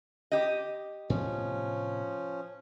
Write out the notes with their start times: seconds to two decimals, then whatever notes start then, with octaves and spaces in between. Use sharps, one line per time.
0.32 G4 D#5
1.10 A2 C3 F3 B3 C#4